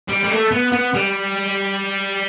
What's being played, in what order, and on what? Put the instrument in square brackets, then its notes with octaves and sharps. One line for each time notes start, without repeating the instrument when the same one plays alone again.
[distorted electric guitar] G3
G3
A3
B3
B3
G3